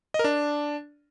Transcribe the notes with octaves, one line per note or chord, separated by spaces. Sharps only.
D#5
A#4
D4